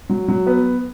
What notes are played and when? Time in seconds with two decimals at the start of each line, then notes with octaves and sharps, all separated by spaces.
0.09 F#3
0.28 F#3
0.47 B3